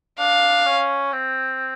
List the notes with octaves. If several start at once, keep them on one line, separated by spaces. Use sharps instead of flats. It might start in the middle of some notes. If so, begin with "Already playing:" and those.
D4 F5
C#4
C4